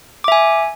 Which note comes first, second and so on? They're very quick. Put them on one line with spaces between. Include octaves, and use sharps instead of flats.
D6 E5 G#5